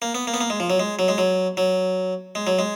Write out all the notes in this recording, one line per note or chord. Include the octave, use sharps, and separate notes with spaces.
A#3
B3
A#3
B3
A#3
G#3
F3
F#3
G#3
F#3
G#3
F#3
F#3
G#3
F#3
G#3